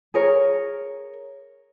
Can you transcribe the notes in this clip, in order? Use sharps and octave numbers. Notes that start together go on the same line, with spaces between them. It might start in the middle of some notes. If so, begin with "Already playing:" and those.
G#4 A#4 C#5